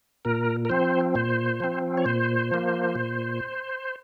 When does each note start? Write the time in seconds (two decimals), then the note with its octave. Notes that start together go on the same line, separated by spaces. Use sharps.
0.25 A#2 A#4
0.65 A#4
0.69 F3 C4 C5
1.15 A#2 C5
1.60 F3 C4
1.97 C#5
2.06 A#2 C5
2.51 F3 A#3
2.95 A#2